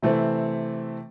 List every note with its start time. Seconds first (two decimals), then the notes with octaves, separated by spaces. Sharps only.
0.03 C3 E3 A3 C4